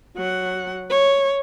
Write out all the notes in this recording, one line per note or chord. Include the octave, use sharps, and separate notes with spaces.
F#3 F#5
C#5